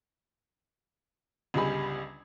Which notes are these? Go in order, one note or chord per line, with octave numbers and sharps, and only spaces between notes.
G1 C#2 G3 G#4 B5